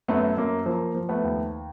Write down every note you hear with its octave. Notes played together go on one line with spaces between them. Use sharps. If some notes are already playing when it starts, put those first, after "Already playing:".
F#2 A3 B3
F#2 A#3
F3 A#3
F3
A3 B3
D#2